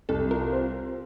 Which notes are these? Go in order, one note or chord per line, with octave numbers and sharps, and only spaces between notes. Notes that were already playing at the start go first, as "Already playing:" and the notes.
C2 A4
F4 A#4
C4